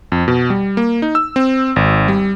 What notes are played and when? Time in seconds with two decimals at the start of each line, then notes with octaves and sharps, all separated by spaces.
0.12 F2
0.28 B2
0.50 G3
0.77 A#3
1.02 D#4
1.15 E6
1.36 C4
1.76 G#1
2.08 G3